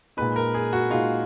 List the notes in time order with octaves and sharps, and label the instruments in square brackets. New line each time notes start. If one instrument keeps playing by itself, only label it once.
[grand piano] A#2 G#3 D#4 [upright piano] B4
[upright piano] A#4
G#4
F#4
[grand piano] A#2 G#3 D#4 [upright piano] F4